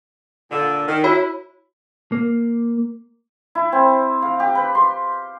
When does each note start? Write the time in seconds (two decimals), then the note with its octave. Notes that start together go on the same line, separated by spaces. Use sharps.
0.50 A#2 D3
0.87 D#3
1.04 E4 F#4 C#5 B5
2.12 A#3
3.55 E4
3.72 C4
4.22 F5
4.40 G4
4.55 B4
4.75 C6